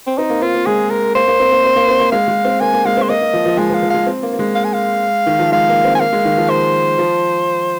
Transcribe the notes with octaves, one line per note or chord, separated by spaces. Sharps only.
C4
C4 D#4
A#3
C4 F4
A#3
G#3 G#4
A#4
A#3 C5
A#3
C4
A#3
C4
A#3
C4
A#3
G#3 F5
G#3
C4
A#3 G#5
A#3
G#3 F5
C4
C5
A#3 D#5
A#3
F3
F3
G#3 G#5
F3
F5
F3
G#3 F5
C4
A#3
A#3
G#3
F5
G#5
F5
D#3
F3
G#3 F5
A#3
C4
G#5
A#3 F5
G#3
D#3
F3
C5
F3